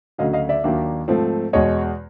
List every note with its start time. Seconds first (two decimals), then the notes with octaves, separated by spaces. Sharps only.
0.18 D2 C#3 F#3 D#5 F5
0.33 D#5 F5
0.49 D5 E5
0.64 D#2 D#3 F#3 A#3 D4
1.08 G#2 F3 A3 C4
1.53 E2 B2 G#3 C#5 D#5